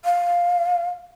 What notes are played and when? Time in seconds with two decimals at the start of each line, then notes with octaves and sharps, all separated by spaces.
0.05 F5